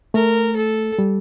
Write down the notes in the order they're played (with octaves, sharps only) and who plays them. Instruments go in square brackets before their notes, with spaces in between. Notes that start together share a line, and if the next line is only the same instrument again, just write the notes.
[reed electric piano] A3 [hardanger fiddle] A#4
[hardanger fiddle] A4
[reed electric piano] G3